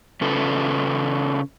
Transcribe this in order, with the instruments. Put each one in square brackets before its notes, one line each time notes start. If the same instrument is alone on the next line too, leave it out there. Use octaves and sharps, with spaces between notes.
[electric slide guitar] C#3 C#4 F4 A4 B4